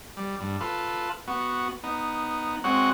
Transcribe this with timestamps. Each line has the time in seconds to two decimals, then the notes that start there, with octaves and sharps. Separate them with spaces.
0.17 G3
0.40 G2
0.61 F4 A4 B4
1.28 B3 F#4
1.83 B3 D#4
2.64 G#3 C4 F#4 C#5 F#5